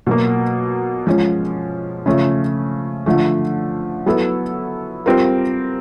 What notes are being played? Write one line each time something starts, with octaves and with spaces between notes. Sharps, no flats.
B2 F#3 A#3
F3 G#3 C#4
C#3 F3 A3 C#4
D3 F3 A3
F#3 B3 E4 A4
G3 C4 F4 A#4